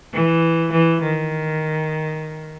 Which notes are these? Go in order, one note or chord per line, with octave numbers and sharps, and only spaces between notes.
E3
E3
D#3